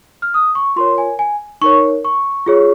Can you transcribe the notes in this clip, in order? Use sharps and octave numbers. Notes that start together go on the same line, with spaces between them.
F6
D#6
C#6
F4 A#4 C#5 C6
G#5
G#5
D#4 A#4 C#5 C#6
C#6
F4 G#4 C#5